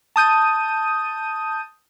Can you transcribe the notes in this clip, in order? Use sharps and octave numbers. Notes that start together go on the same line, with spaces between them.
A5 D#6 G6 D#7